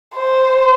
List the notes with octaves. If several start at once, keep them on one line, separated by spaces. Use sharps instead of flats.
C5